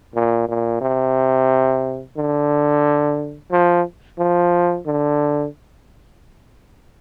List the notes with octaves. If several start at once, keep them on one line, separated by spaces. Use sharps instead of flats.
A#2
A#2
C3
D3
F3
F3
D3